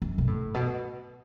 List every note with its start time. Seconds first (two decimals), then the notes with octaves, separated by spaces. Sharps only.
0.02 F#2
0.18 B2
0.27 A2
0.54 B2